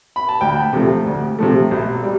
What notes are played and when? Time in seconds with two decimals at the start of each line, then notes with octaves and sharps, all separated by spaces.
0.16 B5
0.29 A5
0.41 D2 G5
0.73 C3 F3 A3
1.06 D2
1.39 C3 F3 A3
1.71 B1
2.03 G3